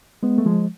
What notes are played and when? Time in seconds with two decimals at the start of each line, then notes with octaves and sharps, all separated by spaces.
0.23 G#3 B3
0.38 A3
0.46 F3 G#3